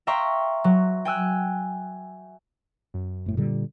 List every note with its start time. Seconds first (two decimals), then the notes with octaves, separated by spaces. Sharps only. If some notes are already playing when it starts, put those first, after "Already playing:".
0.07 E5 F5 G5 A#5 C6 C#6
0.64 F#3
1.05 G5 G#5 E6 F#6
2.94 F#2
3.26 F#1 A2
3.37 A#2 D3 G3